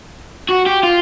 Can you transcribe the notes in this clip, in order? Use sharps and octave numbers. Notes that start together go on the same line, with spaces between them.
F#4
G4
F4